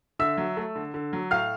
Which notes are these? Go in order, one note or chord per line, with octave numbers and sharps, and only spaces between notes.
D3 E5 E6
F#3
A3
D3
D3
F#3
A2 F5 F6